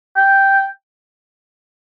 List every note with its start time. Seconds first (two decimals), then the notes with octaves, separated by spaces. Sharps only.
0.17 G5